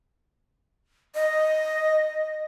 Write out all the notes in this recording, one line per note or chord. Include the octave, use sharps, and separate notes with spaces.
D#5